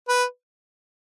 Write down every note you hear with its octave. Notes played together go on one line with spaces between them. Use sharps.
B4